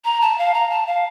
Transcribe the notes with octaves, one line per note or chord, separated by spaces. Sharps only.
A#5
A5
F5
A#5
A5
F5